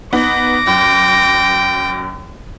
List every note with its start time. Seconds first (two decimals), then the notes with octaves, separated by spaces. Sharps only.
0.13 B3 D#4 D6 A#6
0.67 F#2 G5